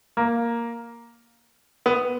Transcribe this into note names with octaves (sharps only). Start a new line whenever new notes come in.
A#3
B3